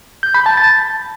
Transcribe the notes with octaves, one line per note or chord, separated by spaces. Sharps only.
G6
B5
A5
A6